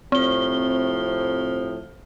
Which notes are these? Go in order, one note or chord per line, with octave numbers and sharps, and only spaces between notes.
A2 C3 F3 C4 G7